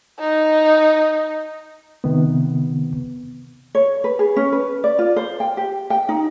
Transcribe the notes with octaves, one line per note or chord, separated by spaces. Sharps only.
D#4
C3 D#3 B3
C#5
B4
G#4
C#4
B4
D5
F4
C5
G5
G4
G5
D#4